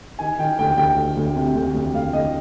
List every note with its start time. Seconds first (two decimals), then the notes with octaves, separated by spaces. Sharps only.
0.19 D#3 G#5
0.38 D#3 G5
0.59 D2 G5
0.77 D2 G5
0.97 D2
1.17 D2
1.36 C3
1.55 D2
1.74 D2
1.94 D2 F5
2.13 D2 D#5